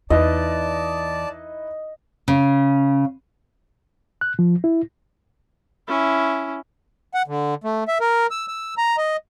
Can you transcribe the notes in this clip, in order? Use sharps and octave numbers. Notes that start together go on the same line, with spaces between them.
E2 D#4 E4 B4 D5 D#5 A5
C#3
F#6
F3
E4
C#4 E4
F#5
D3
A3
E5
A#4
E6
E6
A#5
D#5